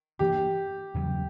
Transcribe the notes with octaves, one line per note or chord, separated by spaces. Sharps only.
G2 E3 A#3 D4 G4
E2 C#3 F#3